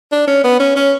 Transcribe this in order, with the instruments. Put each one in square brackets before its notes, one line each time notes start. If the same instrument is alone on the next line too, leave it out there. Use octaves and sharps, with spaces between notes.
[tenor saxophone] D4
C#4
B3
C#4
C#4